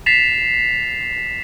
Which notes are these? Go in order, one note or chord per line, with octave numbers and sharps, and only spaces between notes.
A6 B6 C7 E7 F7